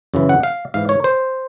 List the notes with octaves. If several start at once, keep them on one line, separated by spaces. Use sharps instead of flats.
F#2 C#3 E3
F#5
F5
G#2 E3 F5
C#5
C5